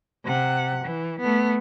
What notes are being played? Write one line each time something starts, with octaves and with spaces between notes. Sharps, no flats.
C3 F#5
E3
A3 B3